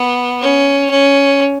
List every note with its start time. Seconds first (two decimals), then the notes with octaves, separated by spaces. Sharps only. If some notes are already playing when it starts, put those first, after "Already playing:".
Already playing: B3
0.41 C#4
0.90 C#4